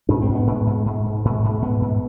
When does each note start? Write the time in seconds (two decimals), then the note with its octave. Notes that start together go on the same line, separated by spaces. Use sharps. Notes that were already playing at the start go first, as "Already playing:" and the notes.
0.09 G#2 D4
0.22 C4
0.29 G#2
0.35 B3
0.47 G#2
0.66 G#2
0.86 G#2
1.06 G#2
1.25 G#2
1.44 G#2
1.62 G#2 B3
1.81 G#2